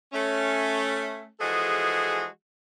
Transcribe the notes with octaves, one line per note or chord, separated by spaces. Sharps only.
A3 C#4
E3 F3 G#3 F#4 G#4 A4